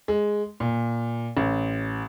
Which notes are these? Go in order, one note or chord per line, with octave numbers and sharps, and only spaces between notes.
G#3
A#2
A1